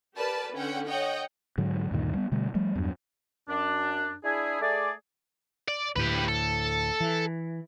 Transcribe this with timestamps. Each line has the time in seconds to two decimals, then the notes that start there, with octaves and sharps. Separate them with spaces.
0.15 G4 A#4 B4 D5 A5
0.54 D3 C#4 F#5 G5
0.87 C#5 D#5 F#5 G5
1.58 G#2 D3 F#3
1.91 D2 G2 A#2 D#3
2.14 G3 B3
2.32 B2 D3 G3 A3
2.54 F3 G3 A3
2.75 E2 G2 F#3 D4
3.48 F#2 D4
4.24 D4 E4 G#4
4.61 A3 G#4 D5
5.68 D5
5.96 D2 A2 G4 B4
6.28 A4
7.00 E3